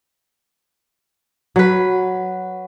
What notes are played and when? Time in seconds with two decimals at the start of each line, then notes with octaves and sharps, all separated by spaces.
1.56 F#3 B4